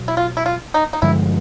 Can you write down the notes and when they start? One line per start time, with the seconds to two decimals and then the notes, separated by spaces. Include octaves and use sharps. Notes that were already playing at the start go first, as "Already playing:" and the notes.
Already playing: B2 F#3
0.08 E4
0.17 F4
0.37 E4
0.46 F4
0.74 D#4
0.93 D#4
1.02 G2 D3 F3 G#3 E4